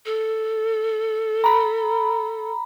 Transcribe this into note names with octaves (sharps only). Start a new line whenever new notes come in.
A4
A#5 B5